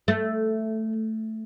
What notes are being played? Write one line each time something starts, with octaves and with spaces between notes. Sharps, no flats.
A3